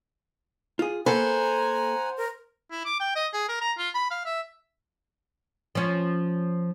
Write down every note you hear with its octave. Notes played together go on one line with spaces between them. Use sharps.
F4 G#4
A#3 A4 B4 C5 F#5 G#5 A#5
A#4
E4
D6
G5
D#5
G#4
A#4
A#5
F4
B5
F5
E5
F3 C#4